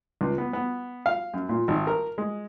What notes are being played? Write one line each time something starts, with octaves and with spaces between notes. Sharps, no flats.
C#2
B3
B3
F5
F#2
A#2
G#1
A#4
G#3